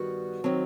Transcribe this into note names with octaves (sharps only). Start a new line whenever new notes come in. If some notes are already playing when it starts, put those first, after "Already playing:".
Already playing: G2 D#3 G3 B3 F#4
D#3 F#3 C4